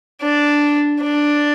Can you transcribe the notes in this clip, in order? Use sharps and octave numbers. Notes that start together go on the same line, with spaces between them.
D4
D4